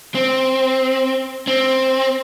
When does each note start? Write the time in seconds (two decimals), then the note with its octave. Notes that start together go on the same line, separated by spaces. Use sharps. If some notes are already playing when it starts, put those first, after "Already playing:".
0.15 C4
1.48 C4